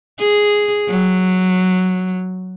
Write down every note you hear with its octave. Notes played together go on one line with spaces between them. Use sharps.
G#4
F#3